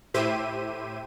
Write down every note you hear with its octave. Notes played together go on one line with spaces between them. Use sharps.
A2 E4 G4 C5 E5 D#7